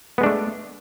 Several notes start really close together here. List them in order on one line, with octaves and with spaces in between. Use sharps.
B3 G#3 D4 A3